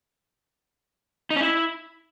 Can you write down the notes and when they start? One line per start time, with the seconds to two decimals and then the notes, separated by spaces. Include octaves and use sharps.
1.30 D#4
1.36 C#4
1.41 E4